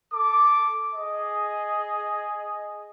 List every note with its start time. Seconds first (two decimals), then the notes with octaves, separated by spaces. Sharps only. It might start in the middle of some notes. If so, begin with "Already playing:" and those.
0.13 A4 D6
0.94 G#4 D#5